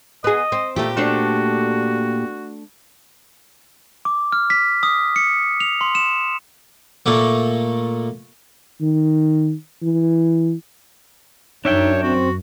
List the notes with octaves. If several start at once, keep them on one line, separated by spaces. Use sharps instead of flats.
B3 G#4 D#5
C4
A#2 A3 G4
A3 D4 F#4 C5
D6
F6
B6
D#6
C#7
F7
C6
E7
A#2 A3 A#3
D#3
E3
F#2 D4 D#4 C#5 E5 G5
C4 F#4